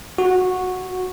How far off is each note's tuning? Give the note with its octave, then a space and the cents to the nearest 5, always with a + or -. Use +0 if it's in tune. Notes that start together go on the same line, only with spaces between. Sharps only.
F#4 -10